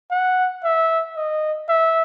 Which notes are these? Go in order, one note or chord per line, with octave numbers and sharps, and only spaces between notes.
F#5
E5
D#5
E5